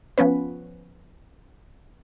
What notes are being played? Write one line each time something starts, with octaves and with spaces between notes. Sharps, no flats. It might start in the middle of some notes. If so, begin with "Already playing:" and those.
F3 B3 C#4 B4